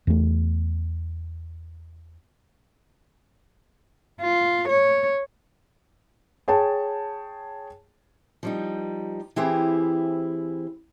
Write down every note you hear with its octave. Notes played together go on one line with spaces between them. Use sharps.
E2 A3
F4
C#5
G#4 C#5 G5 A5
F3 G3 D#4
E3 C4 E4 G4 G#4 C5